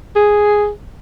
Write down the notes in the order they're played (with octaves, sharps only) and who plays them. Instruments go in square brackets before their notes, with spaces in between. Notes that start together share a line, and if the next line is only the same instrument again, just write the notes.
[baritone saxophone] G#4